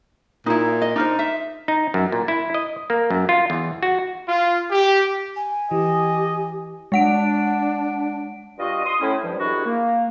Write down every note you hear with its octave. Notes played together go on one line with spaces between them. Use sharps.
A#2 D#4 E4
D#5
D4 D#4 A#4 C5
E5
D#4
F#2
A#2
E4
D#5
A#3
F#2
F4
E2
F#4
F4
G4
G#5
E3 G4 D#5
G#3 D4 F#5 D7
G2 F4 F#4 D#5
C6 D#6
A2 C#4 E4
G2 F3 G3
C3 D#3 D4 E4 F#4 G#4
A#3